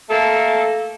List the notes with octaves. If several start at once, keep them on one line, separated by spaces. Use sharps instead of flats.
A3 A#3 A4